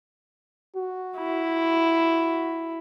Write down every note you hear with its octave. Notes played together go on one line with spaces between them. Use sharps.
F#4
E4